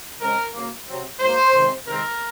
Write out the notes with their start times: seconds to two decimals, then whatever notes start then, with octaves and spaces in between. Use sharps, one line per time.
0.21 C#3 G#3 C4 A#4
0.54 C#3 F#3 A#3
0.88 C3 F#3 C4
1.20 G#2 F#3 A#3 C5
1.54 C3 D#3 G#3 C4
1.87 C3 D#3 G#3 C4 A#4